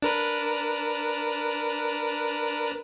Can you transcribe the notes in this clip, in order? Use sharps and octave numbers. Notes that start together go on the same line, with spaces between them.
D4 A#4 B4